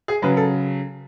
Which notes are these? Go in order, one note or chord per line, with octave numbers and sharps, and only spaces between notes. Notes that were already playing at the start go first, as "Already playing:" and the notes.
G#4
C#3 F#3 B4
A4